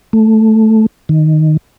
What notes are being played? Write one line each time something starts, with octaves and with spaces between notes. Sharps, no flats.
A3
D#3